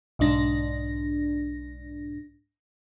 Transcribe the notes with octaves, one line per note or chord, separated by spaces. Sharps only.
B1 G#2 D4 A#6